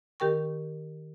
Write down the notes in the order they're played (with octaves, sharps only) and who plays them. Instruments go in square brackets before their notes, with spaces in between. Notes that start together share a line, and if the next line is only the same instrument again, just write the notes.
[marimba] D#3 G4 A#4 G5 C#6